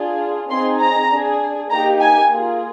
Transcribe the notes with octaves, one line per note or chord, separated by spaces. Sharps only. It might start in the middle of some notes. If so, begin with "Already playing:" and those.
Already playing: D4 F4 G#4
C4 D#4 G#4 C6
A#5
D4 G#4
A#3 D#4 G4 A#5
G#5
A#3 F4 G#4